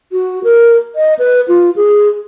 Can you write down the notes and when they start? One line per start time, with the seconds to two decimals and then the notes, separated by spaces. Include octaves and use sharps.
0.12 F#4
0.44 A#4
0.96 D#5
1.19 B4
1.48 F4
1.76 G#4